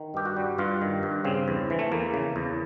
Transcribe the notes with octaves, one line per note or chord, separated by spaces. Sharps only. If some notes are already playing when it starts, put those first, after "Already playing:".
Already playing: D#3
G2 G4
F#4
G3
G2 F4
D#3
G2
C#3 C4
E2
E3
A3
E2 A#3
C#3
E2